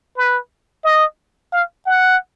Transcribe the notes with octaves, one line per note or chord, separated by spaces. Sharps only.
B4
D#5
F5
F#5